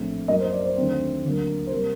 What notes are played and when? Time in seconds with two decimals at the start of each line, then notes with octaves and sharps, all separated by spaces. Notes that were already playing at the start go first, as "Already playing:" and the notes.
Already playing: A#1 A2 A3 C4
0.28 F#2 F#3 A#3 D#5
0.40 C5
0.52 D5
0.65 C5
0.77 D#2 D3 F#3 A3 C4
1.24 D2 D3 F#3 A#3
1.67 C5
1.72 C3 G3 A#3 A#4